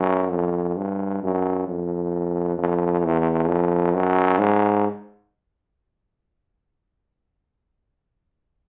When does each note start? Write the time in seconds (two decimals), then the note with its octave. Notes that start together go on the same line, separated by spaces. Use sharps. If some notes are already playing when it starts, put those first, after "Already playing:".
Already playing: F#2
0.31 F2
0.77 G2
1.23 F#2
1.68 F2
2.58 F2
3.04 E2
3.48 F2
3.94 F#2
4.39 G#2